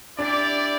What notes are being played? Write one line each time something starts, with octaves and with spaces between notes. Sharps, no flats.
D4 E4 G4 D5